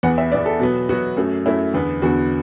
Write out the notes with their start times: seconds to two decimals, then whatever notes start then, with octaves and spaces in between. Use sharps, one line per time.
0.03 E2 E3 B3 F#5
0.18 E5
0.31 B3 D5
0.34 E2 E3
0.46 A4
0.60 B2 F#3 B3
0.89 B2 F#3 B3 F#4
1.17 F#2 F#3 A3
1.46 F#2 F#3 A3 E4
1.74 E2 D3 B3
2.02 E2 D3 B3 F#4